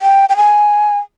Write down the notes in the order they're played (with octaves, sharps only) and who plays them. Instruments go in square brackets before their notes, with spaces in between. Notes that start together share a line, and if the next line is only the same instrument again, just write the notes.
[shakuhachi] G5
G5
G#5